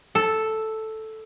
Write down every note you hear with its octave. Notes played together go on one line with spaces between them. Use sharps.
A4